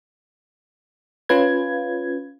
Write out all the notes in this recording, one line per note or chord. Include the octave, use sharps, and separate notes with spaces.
C#4 F4 B4 G#6